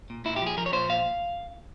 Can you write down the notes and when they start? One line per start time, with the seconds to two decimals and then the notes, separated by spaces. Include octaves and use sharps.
0.10 A#2
0.25 A#2 E4
0.36 G4
0.42 F3 G#4
0.58 F3 A#4
0.66 C#5
0.73 A#2 C5
0.89 A#2 F5